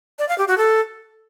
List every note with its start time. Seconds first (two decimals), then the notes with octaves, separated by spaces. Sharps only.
0.19 D5
0.28 F5
0.38 G4
0.48 F#4
0.57 A4